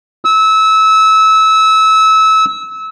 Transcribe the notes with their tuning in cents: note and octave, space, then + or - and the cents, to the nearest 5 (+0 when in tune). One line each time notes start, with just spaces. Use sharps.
E6 -25